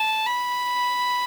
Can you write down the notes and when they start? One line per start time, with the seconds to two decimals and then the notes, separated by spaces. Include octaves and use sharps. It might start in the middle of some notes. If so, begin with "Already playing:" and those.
Already playing: A5
0.26 B5